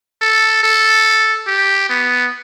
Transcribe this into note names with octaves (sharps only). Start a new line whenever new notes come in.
A4
A4
G4
B3